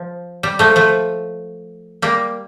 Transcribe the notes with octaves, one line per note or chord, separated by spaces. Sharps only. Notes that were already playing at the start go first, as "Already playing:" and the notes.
Already playing: F3
G3
F3 A3
F3 A3
G3 A#3